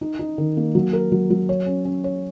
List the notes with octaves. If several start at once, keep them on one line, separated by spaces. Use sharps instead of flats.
D#4
D#4
D#3
A#3
F#3
A#4
F#3
F#3
C#5
C#4
C#4
C#5